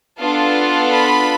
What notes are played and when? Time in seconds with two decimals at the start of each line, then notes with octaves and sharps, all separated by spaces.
0.20 B3 D4 F4 A4
0.91 B5